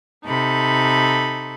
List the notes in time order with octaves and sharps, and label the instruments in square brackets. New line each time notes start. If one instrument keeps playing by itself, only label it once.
[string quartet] C3 D#4 A4 B5